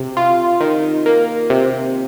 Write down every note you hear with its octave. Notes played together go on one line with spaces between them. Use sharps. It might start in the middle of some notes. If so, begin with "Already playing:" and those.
Already playing: C3
F4
D#3
A#3
C3